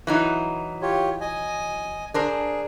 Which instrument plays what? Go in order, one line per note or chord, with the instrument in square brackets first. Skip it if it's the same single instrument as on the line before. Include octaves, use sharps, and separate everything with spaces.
[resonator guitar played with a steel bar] E3 F#3 D#4
[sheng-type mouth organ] F4 G4 C#5
D#5 G#5
[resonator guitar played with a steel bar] D4 A#4 C5 [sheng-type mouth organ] G#4